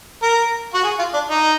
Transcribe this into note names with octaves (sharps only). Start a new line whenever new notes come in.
A#4
F#4
G#4
F4
D4
D#4